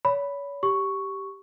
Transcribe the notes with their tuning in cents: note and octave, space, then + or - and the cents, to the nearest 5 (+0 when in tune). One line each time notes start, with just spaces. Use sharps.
C#5 +35 B5 +0
G4 -5 C#6 +0